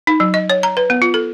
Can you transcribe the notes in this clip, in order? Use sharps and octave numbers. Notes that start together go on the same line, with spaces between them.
D#4
F#3
D#5
C#5
A#5
B4
B3
F4
A4